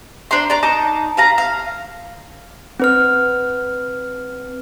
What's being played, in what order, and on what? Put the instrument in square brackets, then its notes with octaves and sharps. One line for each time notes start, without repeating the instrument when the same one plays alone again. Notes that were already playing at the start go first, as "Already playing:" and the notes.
[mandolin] D4 C5 A#5 C6
D5 A#5
D#4 A5 A#5 D6
B4 F5 A#5
F5
[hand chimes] C4 B4 F6